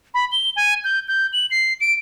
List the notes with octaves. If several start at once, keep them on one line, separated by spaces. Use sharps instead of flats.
B5
G7
G#5
G6
G6
F#7
C7
D7